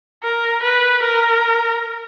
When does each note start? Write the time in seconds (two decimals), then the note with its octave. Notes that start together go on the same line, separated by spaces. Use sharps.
0.23 A#4
0.63 B4
1.03 A#4